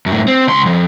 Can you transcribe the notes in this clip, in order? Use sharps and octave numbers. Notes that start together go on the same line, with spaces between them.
F#2 A2
C4
C#2 C6
F2